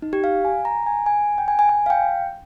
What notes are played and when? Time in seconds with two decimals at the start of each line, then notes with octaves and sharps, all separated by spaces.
0.02 D#4
0.13 G4
0.24 F5
0.45 G#5
0.65 A#5
0.86 G#5
1.06 G#5
1.38 G5
1.48 G#5
1.59 G#5
1.69 G#5
1.86 F5
1.90 G5